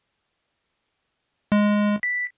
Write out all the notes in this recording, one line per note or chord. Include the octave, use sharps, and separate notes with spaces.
G#3
B6